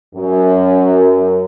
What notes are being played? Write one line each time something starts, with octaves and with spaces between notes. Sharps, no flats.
F#2